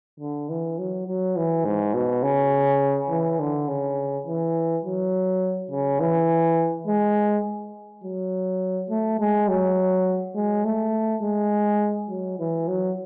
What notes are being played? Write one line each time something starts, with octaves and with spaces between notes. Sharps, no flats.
D3
E3
F#3
F#3
E3
G#2
B2
C#3
E3
D3
C#3
E3
F#3
C#3
E3
G#3
F#3
A3
G#3
F#3
G#3
A3
G#3
F#3
E3
F#3